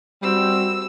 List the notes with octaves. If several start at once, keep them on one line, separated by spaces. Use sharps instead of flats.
G3 C4 F#4 E6